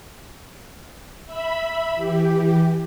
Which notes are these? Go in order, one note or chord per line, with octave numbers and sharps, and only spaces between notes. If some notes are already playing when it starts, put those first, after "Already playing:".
E5 B5
E3 G4